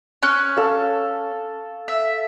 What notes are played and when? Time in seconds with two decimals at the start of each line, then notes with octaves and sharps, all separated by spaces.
0.23 C#4 F#6
0.57 A4 F5
1.88 E5